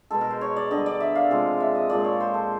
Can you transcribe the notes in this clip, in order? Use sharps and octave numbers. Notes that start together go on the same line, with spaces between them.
B2 G#3 A4
A#4
C5
C#5
D5
D3 G3 D#5
D5
E5
F5
C3 F3 G#3
E5
D#5
A#2 F3 G#3 D5
C#5
C5
A4